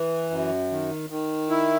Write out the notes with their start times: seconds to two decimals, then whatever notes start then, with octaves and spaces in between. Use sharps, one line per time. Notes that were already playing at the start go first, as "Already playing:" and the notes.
Already playing: E3
0.30 F#2
0.71 D#3
1.10 D#3
1.50 E4